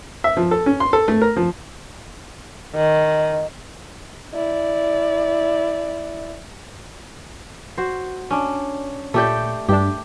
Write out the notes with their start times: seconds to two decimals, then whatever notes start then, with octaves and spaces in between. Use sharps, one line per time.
0.24 E5
0.37 F3
0.51 A4
0.66 C#4
0.80 C6
0.93 A4
1.08 A3
1.22 A#4
1.37 F3
2.75 D#3
4.34 E4 D5
7.77 F#4 C5
8.31 C#4 D4
9.14 A#2 A3 G4 D5 G6
9.69 G2 D4 G4